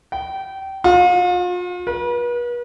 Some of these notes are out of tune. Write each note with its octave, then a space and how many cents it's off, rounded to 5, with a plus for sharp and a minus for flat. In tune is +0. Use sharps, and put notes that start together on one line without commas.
G5 -25
F4 +40
B4 -40